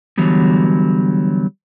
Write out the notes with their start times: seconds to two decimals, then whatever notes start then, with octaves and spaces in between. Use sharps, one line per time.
0.18 D3 E3 F#3 G3 B3